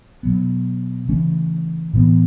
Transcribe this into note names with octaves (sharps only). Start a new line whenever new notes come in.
B2 F#3 B3
C#3 E3 A3 C#4
A2 E3 B3